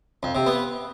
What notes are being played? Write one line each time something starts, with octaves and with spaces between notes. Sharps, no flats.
F2
C3
B3